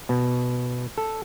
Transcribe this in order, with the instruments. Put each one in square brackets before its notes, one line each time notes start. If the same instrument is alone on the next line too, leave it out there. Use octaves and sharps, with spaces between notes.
[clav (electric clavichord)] B2
A4